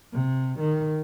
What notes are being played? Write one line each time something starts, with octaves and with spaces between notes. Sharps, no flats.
C3
D#3